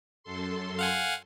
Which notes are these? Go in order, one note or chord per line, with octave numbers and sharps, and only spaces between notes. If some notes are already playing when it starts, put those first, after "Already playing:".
F#2 A4 C6
F5 F#5 G#5